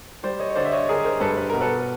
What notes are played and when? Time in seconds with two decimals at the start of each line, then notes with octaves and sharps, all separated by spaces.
0.23 G3 C5 D5
0.40 C#5 D#5
0.50 C#5
0.55 D3 C5 D5
0.65 E5
0.72 C#5 D#5
0.89 D3 G#4 A#4
1.04 A#4 C5
1.20 G2 A4 B4
1.37 B4
1.49 B2 A#4
1.61 A4 B4